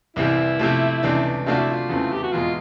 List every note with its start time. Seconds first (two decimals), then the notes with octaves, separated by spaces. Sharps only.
0.16 C2 C3 E3 G3 E4
0.59 C3 F3 A3
1.03 C#2 C3 E3 A3 D4
1.46 C3 F3 A3 D4 F4 F#4
1.58 E4
1.71 F4
1.89 E2 C#3 E3 A3 C4
2.13 G4
2.23 F#4
2.33 E2 B2 G#3 F4